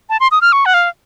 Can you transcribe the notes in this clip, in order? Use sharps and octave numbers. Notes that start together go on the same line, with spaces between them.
A5
C6
D#6
F6
C#6
F#5
F5